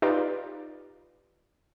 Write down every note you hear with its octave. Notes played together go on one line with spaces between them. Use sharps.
D#4 F4 G4 B4 D5